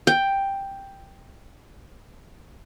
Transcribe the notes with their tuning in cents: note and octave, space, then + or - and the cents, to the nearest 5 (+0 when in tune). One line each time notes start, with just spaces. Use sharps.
G5 +5